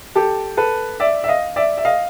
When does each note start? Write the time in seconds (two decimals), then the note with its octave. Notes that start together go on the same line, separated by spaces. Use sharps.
0.15 G4 A4
0.57 A4 B4
1.00 D5 E5
1.24 E5
1.28 D#5 F5
1.56 D5 E5
1.78 E5
1.85 D#5 F5